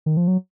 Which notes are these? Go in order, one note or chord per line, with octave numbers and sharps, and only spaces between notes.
D#3
F3
F#3